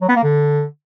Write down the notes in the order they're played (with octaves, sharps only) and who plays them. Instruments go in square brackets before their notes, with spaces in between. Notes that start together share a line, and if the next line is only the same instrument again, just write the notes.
[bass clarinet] F#3
B3
A#3
D3